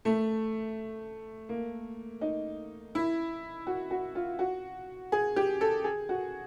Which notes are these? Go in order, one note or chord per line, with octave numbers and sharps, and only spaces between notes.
A3
A#3
D#4
E4
F#4
F#4
F4
F#4
G#4
G4
A4
G#4
F#4